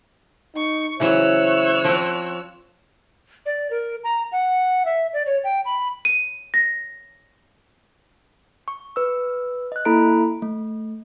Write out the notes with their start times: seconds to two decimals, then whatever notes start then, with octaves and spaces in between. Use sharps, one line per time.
0.55 D#4 C#6
1.00 C#3 E3 F#3 E4 C5 C#5 E6 F#6
1.84 F3 C4
3.46 D5
3.71 A#4
4.04 A#5
4.32 F#5
4.85 E5
5.13 D5
5.26 C#5
5.44 G5
5.65 B5
6.05 D#7
6.54 A#6
8.68 C#6
8.96 B4 E6
9.72 D#5 F#6
9.85 A#3 E4 A4 A#5 B5 D7
10.42 A3